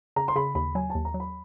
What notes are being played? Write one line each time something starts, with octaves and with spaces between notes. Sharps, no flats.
C#3 A#5
C6
C#3 B5
D#2 B5
F#3 G#5
A5
D#2
A#5
F#3
B5